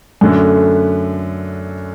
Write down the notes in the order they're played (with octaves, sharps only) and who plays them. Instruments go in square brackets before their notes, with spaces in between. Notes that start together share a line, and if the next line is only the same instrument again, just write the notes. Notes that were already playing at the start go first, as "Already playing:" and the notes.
[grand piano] F#2 D3 A3